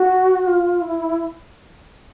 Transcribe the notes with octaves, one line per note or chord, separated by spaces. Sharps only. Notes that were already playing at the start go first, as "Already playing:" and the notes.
Already playing: F#4
F4
E4